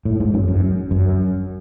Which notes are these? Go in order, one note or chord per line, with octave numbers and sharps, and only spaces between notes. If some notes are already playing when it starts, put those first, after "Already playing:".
A2
G#2
F#2
F#2
F#2